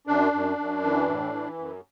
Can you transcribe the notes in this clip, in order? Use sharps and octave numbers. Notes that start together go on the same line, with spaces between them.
F#2 D4
F#2
F#2
E3
A2
E3
F#2